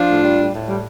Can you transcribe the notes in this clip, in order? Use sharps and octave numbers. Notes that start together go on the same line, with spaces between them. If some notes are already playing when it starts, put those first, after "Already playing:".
Already playing: F3 D4 F4
A2
G3
A2
A2
G3